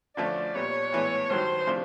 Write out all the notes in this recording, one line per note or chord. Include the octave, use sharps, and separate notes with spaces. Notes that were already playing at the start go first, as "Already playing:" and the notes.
D3 F3 A3 C#4 D5
A#2 G3 B3 C#5
A2 E3 G#3 B3
G2 D#3 F#3 C5
C3 F3 A3 D4